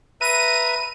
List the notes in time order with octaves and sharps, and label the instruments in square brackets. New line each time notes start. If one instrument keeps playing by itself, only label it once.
[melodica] B4 E5 A#5 [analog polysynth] D#7